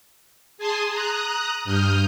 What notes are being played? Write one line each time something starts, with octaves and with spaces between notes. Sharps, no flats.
G#4 G#5 A5 C6 D#6
A#5 D#6 F#6
G2 D#6 F6 G6